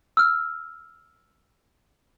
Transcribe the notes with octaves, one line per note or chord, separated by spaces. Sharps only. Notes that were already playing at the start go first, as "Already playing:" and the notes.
E6 F6